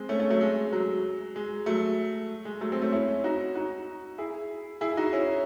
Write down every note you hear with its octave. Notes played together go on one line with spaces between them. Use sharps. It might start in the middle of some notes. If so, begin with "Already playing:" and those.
Already playing: G#3 C4
A3 C#4
A3 C#4
F#3 A3
G#3
F#3
G#3
F#3 A3
G#3
F#3 A3
G#3 C4
A3 C#4
C#4 E4
D#4 F#4
D#4 F#4
E4 G#4
E4 G#4
E4
D#4 F#4
C#4 E4